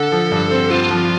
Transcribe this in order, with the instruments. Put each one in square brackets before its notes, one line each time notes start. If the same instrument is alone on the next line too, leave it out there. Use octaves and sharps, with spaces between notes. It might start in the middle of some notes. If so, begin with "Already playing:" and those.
Already playing: [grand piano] D3 [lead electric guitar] A4
[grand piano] F3
G2
C4
[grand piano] C4 [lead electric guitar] F4
[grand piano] F3